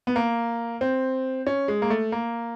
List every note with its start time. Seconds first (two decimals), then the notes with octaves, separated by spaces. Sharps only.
0.07 B3
0.16 A#3
0.81 C4
1.47 C#4
1.68 G#3
1.82 A#3
1.90 A3
2.12 A#3